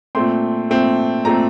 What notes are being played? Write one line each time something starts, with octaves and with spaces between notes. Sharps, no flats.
A#2 A3 C4 C6
A#2 A3 C4
A#2 A3 C4 A#5